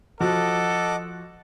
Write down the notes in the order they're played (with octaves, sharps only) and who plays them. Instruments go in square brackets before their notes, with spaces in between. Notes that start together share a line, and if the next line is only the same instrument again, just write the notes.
[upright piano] F3 F#4 [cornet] A4 [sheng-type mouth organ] D#5 F#5 D6